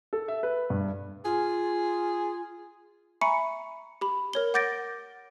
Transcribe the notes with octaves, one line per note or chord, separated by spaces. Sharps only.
A4
E5
B4
G2
F4 G#4
E5 G#5 A#5 B5 C#6 C#7
G4 B5
A#4 C#5 G7
F#5 D6 G6 A6 A#6 D7